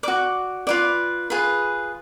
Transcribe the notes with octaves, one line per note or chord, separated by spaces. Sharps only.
F#4 D5 D6
F4 B4 D5
F4 G#4 B4